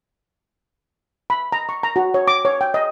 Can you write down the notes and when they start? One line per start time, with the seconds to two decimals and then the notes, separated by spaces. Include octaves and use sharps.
1.30 B5
1.52 A#5
1.69 C#6
1.83 A#5
1.96 F#4
2.14 C#5
2.28 D6
2.45 C#5
2.61 G5
2.74 D#5